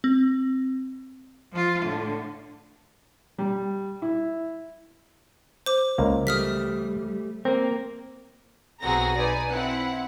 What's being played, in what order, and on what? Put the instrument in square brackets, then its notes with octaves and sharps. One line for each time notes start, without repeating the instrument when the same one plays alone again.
[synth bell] C4
[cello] F3 F4
A2 D3
[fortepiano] G3
E4
[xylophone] C5 D6
[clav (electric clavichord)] C#2 A#3
[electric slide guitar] G3 A3 [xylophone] D#6 F6 B6
[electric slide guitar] A#3 A#4 [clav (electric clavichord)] C4
[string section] B1 C4 F#4 G#4 A#5 A#6
D#4 B4 D5 G#5
C4 E4 F#5